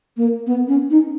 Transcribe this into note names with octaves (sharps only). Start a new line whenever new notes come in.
A#3
B3
C#4
D#4